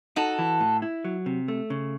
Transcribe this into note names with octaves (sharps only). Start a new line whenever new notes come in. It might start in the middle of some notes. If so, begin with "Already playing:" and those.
D#4 F#4 A4
E3
A2
E4
F#3
C3
A3
C#3